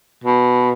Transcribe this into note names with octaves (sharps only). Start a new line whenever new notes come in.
B2